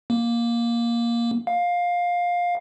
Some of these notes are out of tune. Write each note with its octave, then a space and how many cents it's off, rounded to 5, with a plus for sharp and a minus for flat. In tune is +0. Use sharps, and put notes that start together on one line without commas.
A#3 +10
F5 +15